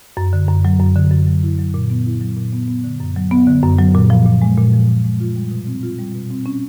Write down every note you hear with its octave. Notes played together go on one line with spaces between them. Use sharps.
F#2
D3
F#2
F#3
F#2
D3
F#2
F#3
E4
F#3
A#2
B3
E4
F#3
A#2
B3
B3
D3
F#2
F#3
B3
D3
F#2
F#3
A#2
F3
A#2
G#3
A#2
F3
A#2
G#3
F4
G3
B2
C4
F4
G3
B2
C4
C#4